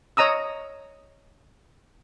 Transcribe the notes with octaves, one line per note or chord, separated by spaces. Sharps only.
C#5 D#5 A#5 D#6 E6